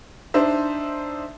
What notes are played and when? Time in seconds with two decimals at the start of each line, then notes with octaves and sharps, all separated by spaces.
0.34 D4 D#4 C5 E5